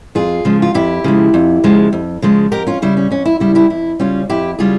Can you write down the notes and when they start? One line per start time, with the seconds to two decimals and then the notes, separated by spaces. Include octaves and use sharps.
0.15 F2 F4 G#4
0.45 C#3 F3 G#3
0.62 F4
0.74 F2 E4 G4
1.04 C#3 F3 G#3
1.34 F2
1.64 C#3 F3 G#3
1.93 F2
2.22 C#3 F3 G#3
2.52 F2 G4 A#4
2.66 C#4 F4
2.82 C#3 G3 E4
2.97 C#4
3.11 F2 C#4
3.25 E4
3.40 C#3 G3 E4
3.55 E4 G4
3.70 F2 E4
3.99 C#3 G3 C#4 F4
4.29 F2 E4 G4
4.59 C#3 G3 F4 G#4